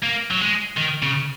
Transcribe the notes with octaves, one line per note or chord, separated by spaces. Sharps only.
A#3
F#3
G#3
D#3
C#3